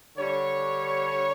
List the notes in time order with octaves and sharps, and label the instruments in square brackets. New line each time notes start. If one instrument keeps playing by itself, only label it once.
[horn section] D3 G3 D4 C#5